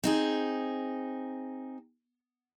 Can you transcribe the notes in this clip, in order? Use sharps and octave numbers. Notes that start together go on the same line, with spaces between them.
C4 D#4 G#4